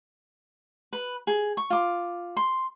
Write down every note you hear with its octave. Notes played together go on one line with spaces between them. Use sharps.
B4
G#4
C#6
F4 D6
C6